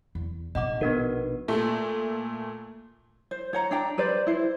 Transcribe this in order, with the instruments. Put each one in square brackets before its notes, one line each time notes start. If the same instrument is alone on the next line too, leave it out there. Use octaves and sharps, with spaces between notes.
[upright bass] E2
[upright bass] A#1 D#4 [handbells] D#5 F#5 D6
[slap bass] B2 [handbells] B3 D4 A#4
[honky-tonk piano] A#2 A3
[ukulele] C5
C#5 F#5 A#5
D4 G5 A#5
G4 B4 C5 D5
E4 C5